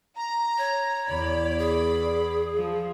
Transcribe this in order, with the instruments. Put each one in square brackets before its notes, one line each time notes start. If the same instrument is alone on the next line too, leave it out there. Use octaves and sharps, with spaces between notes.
[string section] A#5
[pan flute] C#5
[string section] E2 D5 B5
[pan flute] G#4
[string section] F3